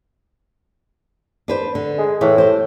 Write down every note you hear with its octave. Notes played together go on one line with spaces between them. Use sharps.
D4 B4 C5
D3
G#3
A2 E3
G4 C5